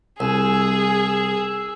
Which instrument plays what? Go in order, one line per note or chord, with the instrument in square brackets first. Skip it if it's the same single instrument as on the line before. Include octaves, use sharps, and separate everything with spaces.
[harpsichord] C2 [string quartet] G#4 [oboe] E6